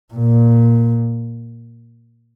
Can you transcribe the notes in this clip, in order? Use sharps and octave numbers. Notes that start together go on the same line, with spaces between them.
A#2